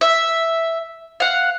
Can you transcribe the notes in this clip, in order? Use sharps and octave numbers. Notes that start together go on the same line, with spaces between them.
E5
F5 F#5